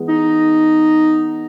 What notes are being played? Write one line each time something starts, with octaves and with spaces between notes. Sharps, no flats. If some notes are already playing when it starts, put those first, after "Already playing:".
Already playing: E3 G#3 B3
D#4